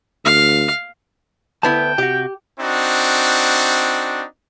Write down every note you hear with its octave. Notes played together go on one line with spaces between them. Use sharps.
D2 F5
D2 B3 E4 G5 A5
C3 F#4 G4
C4 D4 D#4 F#4